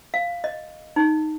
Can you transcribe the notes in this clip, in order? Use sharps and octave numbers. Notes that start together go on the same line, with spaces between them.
F5
D#5
D#4